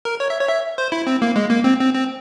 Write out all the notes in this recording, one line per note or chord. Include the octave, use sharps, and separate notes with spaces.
A#4
C#5
E5
C#5
E5
C5
E4
C4
A#3
G#3
A#3
C4
C4
C4